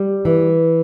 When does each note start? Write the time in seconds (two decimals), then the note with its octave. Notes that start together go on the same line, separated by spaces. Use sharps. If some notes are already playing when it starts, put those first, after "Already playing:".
Already playing: G3
0.25 E3